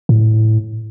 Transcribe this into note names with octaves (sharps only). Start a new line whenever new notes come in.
A2